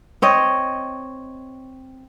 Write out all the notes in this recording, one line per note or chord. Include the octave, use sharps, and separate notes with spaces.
C4 C#5 D#5